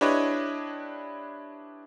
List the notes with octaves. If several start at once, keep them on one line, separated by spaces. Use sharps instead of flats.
D4 E4 G4 B4 C#5 D#5